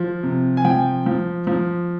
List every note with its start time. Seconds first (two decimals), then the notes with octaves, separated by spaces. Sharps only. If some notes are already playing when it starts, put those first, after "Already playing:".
Already playing: F3
0.23 C3
0.57 G#5
0.65 F3 G5
1.06 F3
1.47 F3